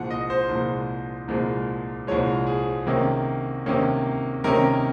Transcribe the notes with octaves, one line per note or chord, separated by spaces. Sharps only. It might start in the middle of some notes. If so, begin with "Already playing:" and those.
Already playing: C2 A#2 F3 G#3 F#5
D#5
C5
C2 A#2 F3 G#3
C2 A#2 F3 G#3
C2 A#2 F3 G#3 C#5
G#4
C3 D#3 A#3 C#4
C3 D#3 A#3 C#4
C3 D#3 A#3 C#4 A#4